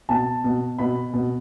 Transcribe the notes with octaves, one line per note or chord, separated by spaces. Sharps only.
B2 A5
B2
B2 B5
B2